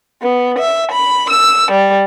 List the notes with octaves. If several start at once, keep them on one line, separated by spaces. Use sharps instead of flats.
B3
E5
B5
E6
G3